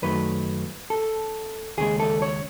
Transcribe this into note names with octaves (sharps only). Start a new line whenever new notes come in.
F#2 D#3 F#3 A3 B4
A4
D#2 C#3 G#3 G#4
A4
C#5